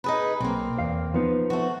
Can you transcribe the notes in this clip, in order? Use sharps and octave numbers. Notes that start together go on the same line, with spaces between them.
D#4 G#4 B4
B1 A#3 C4
E2 F5
F3 B3 D#4
A3 F#4